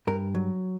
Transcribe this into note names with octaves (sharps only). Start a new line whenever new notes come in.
G2 A#4
F#3